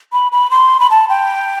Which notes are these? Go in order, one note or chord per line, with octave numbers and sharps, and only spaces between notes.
B5
B5
C6
B5
A5
G5